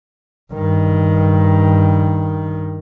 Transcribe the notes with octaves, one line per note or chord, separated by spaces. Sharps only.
G2 D#3